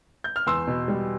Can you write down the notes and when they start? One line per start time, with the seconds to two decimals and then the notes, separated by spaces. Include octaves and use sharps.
0.24 G6
0.36 F6
0.46 E2 C6 E6
0.67 B2
0.88 G3